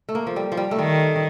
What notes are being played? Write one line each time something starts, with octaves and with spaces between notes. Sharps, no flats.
A3
A#3
F3
G3
F3
G3
A3
D#3 G3